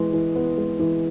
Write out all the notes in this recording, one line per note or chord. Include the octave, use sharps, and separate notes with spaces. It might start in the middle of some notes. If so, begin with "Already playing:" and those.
Already playing: E3 G#3 B3
E3
B3
G#3
E3